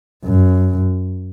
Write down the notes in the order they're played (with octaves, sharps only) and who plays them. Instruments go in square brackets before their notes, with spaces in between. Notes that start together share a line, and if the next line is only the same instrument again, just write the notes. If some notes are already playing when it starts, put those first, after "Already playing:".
[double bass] F#2